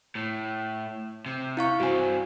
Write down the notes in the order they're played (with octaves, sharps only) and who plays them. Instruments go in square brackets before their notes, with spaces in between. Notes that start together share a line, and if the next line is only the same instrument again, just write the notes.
[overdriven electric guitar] A2
C3
[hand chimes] E4 F5 C#6
[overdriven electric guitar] G2 C4 [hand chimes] F#4 G#5